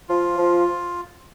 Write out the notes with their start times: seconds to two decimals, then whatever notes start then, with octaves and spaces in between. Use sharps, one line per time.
0.09 F3 F4
0.38 F3